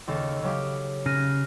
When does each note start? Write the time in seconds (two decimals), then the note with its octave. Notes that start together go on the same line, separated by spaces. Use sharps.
0.08 D#2 C#3 A4
0.42 C#3 F#3 G4
1.06 C#3 F6 A#6 D#7